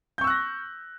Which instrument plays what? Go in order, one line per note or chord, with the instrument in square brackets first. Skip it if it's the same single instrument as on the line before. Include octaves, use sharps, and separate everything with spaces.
[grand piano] G6
C#6
E6
F#6
A#6